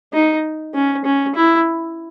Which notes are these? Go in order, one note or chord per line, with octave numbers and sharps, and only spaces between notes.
D#4
C#4
C#4
E4